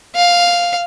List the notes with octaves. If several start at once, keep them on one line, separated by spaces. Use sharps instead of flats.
F5